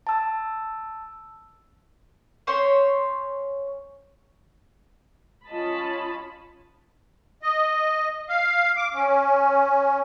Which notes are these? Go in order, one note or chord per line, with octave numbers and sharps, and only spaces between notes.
A5 E6
C#4 C5 C#5 C6
C#4 F4 D#5 A5 B5
D#5
F5
D6
C#4